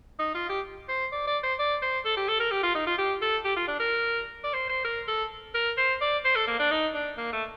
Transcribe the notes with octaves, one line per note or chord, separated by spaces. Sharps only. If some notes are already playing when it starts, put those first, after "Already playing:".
D#4
F4
G4
C5
D5
D5
C5
D5
C5
A4
G4
A4
A#4
G4
F4
D#4
F4
G4
A4
G4
F4
D4
A#4
D5
C5
C5
A#4
A4
A#4
C5
D5
C5
A4
A#3
D4
D#4
D4
A#3
A3